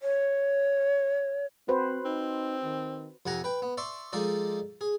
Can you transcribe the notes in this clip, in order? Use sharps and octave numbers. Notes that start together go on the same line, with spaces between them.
C#5
C4 F#4 B4 C5
C4 D#4
D#3
F2 C3 F#5 G#5 A#5
B4 G5
B3
D5 E5 C6 C#6
F3 G#3 D#4 A4 D5
G#4